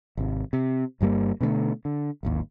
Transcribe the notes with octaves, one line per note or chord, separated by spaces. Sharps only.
G#1 C3
C3
G1 G2 G3 A#3
B2 D3 G#3 A3
D3
D1 G#1 D#2